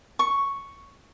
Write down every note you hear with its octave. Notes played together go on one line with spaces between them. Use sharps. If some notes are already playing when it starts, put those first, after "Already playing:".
C#6